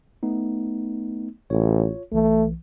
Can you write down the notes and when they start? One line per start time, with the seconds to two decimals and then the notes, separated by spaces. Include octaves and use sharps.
0.23 A3 B3 D#4
1.50 A1 F4 C#5
2.12 B1 E3 A3